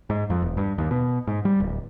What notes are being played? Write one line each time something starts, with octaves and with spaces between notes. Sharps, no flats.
G#2
F2
E1
G2
D#2
B2
G#2
G3
D1